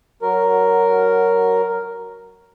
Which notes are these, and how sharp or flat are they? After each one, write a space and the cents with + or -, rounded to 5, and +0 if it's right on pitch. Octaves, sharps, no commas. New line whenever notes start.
F#3 +10 F#4 +0 A#4 +0